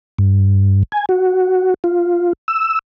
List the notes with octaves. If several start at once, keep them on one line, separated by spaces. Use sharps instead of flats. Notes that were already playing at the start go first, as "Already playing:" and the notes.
G2
G#5
F#4
F4
E6